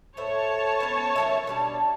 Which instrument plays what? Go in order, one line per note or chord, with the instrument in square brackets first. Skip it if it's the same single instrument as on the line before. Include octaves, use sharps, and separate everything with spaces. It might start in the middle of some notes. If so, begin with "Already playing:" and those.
[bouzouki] A2 C5 E5 [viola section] C#5 A5
[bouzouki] B3 C#4 C5
D#3 F#3 E5
B2 G3 D4